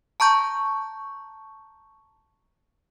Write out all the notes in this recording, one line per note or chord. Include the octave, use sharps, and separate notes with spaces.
A5 A#5 C#6 G6